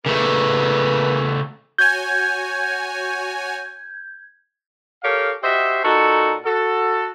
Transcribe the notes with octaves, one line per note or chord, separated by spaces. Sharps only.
C#3 A3 A#3 B4
F#4 C#5 G#5 G6 G#6
G4 A4 A#4 C#5 F5
F#4 G4 C5 D#5 E5
A#2 D#4 F#4 A4
F#4 A4